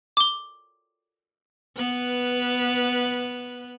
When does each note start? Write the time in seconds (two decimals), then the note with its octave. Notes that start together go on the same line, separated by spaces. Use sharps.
0.17 D6 G7
1.77 B3 B4